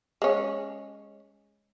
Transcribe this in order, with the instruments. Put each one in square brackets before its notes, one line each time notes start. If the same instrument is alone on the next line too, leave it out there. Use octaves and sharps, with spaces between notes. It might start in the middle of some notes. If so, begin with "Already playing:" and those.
[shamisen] G#3 C#4